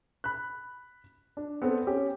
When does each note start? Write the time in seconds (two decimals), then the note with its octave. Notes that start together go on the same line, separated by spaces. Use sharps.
0.24 B5 F#6
1.37 D4
1.62 B3 C4 A4 C5
1.87 C#4 G4